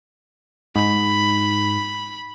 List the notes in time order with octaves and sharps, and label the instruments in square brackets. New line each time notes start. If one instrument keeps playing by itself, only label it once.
[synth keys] G#2 [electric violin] B5